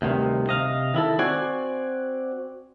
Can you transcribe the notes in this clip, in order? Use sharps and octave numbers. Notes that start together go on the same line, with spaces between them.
D2 G2 C3 D#3
C3 D#5 F5
D#3 E4 A4
C4 F#4 D5 G#5